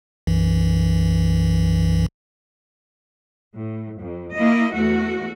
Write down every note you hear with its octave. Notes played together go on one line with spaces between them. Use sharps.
B1 F#2 E3
A2
F2
A#3 E4 D#5
E2 A3 F#4